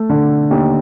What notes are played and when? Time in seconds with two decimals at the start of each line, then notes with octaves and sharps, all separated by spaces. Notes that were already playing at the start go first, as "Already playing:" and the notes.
Already playing: A3
0.09 D3
0.51 D#2